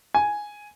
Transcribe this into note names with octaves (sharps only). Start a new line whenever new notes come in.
G#5